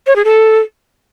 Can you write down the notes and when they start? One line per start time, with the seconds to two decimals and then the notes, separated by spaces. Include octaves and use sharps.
0.07 C#5
0.16 G#4
0.25 A4